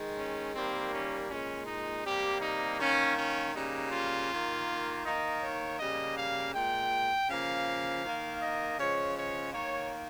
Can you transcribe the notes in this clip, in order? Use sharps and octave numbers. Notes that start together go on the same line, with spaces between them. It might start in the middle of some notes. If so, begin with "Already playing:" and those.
Already playing: D#3 G#3
C#4
D#3 G3 A#3 C4
C#4
A#2 G#3 C#4
D#4
C3 G3 A#3 G4
D#4
D#3 A#3 C#4
C#4
C#3 G3 A#3 D#4
F4
D#3 A#3
D#3 A#3 D#4
C#5
C#3 G3 A#3 D#5
F5
A#2 G#3 G5
C#3 F3 A#3 F5
D#3 A#3
D#5
C#3 F3 G#3 C#5
C#5
D#3 A#3 C#5